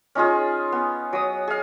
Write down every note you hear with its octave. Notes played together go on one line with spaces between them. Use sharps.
C#4 D#4 F4 G#4
B3
F#3 D#6
G#4 F5